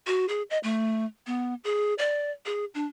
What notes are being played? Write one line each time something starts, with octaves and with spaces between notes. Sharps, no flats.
F#4
G#4
D#5
A3
B3
G#4
D5
G#4
D4